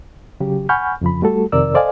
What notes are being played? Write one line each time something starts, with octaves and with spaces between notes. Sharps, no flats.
C#3 F#3 G4
F#5 G#5 B5 C#6 F6 G6
F2 C#3 F3 B5
G3 A3 F#4 A4
F2 C3 D#3 A#4 D5 E6
A4 C5 D5 D#5 F5 G#5